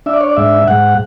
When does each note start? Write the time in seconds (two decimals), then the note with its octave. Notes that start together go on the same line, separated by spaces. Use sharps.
0.06 D4 E5
0.14 D5
0.21 C#5
0.29 D5
0.36 G#2 E5
0.67 G#2 F#5